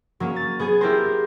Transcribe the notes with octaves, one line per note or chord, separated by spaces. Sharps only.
F#3 A#3 C#4
A6
B3 G#4 G#6
E4 G4 A#4 C5